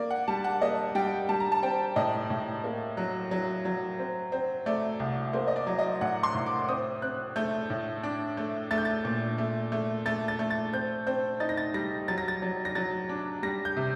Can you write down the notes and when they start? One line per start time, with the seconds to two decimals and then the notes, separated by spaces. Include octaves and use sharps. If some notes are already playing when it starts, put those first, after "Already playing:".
Already playing: A#3 D5
0.11 F#5
0.28 G3 A5
0.44 F#5
0.61 A#3 D#5
0.95 G3 G5
1.29 G3 A5
1.40 A#5
1.52 A5
1.63 C4 G5
1.96 A2 D#5
2.30 A2
2.64 A#3
2.97 F#3
3.31 F#3
3.65 F#3
3.99 C4
4.32 C4
4.66 A3 D5
5.00 C2
5.33 A#3 C5
5.48 D#5
5.56 D5
5.67 F#3
5.79 D#5
6.01 A2 F#5
6.23 C6
6.35 A2
6.46 D6
6.68 C4 D#6
7.02 C4 F#6
7.36 A3 G6
7.70 A2
8.03 D4
8.37 A3
8.71 A3 A6
8.78 G6
8.85 A6
9.05 A#2
9.38 A3
9.72 A3
10.06 A3 A6
10.28 A6
10.39 A3
10.50 A6
10.73 C4 G6
11.07 C4 G6
11.40 D#4 A6
11.49 A#6
11.57 A6
11.74 G3 A#6
12.08 F#3 A6
12.18 A#6
12.28 A6
12.42 F#3
12.65 A#6
12.75 F#3 A6
13.09 D4
13.43 G3 A#6
13.65 G6
13.77 C3